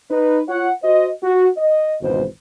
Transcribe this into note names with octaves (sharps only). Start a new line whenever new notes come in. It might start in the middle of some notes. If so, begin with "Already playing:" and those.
D#4 B4
F4 C#5 F#5
F#4 C5 D#5
F#4
D#5
G#1 C#2 B2 E3 C5